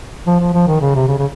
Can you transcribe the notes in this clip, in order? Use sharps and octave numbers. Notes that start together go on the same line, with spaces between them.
F3
F3
F3
D#3
C#3
C3
C#3
C#3